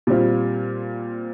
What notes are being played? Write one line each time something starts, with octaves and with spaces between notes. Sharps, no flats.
A#2 G3 C4 F4